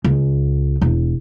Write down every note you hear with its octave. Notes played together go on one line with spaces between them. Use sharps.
C#2
E1